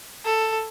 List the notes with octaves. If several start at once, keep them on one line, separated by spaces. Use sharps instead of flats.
A4